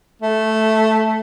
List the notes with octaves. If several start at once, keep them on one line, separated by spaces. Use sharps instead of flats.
A3